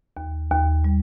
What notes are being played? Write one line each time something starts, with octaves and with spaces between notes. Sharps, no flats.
D#2
D#2
G3